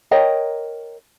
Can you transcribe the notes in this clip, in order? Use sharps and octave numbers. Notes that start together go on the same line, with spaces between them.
A#4 C#5 D#5 G5